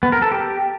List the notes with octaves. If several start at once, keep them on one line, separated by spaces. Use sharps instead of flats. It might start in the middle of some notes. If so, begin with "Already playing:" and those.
B3
A#4
A4
G4